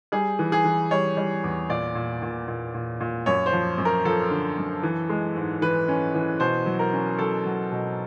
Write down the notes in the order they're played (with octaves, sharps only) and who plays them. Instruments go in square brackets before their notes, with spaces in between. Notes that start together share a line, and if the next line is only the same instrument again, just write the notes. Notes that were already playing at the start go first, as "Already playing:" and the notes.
[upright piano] G3 G#4
E3
G#4
E3
G3 C#5
G3
E2
A#2 D5
A#2
A#2
A#2
A#2
A#2
F#2 C#5
C5
F3
F#2
A#4
F3 A4
D3
F#2
E3
G#3
G#2
E3 B4
C#4
E3
B2 C5
F#3
A#4
C#4
F#3 A4
F#3
B2